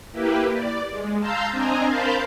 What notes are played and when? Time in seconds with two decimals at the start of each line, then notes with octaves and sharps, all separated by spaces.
0.12 A#3 E4 G4 B4
0.54 D5
0.90 G#3
1.20 F5 A5 A#5 C6 E6 G6
1.51 C4 D4 D#5 G#5 A#5
1.87 A#4 C5 F5 A5 B5 G6